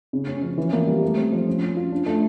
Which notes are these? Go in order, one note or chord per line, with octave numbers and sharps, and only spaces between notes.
C#3
C#4
F3
E3
A#3
G3
A3
C4
F3
C#4
C#4
F4
D4
A3